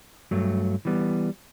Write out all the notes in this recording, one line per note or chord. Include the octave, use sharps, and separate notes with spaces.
G2 F#3 A3
E3 G3 B3